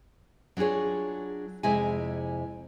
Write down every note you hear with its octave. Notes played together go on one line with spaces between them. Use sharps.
F#3 D4 F4 G#4 C#5
F2 C3 G#3 E4 G#5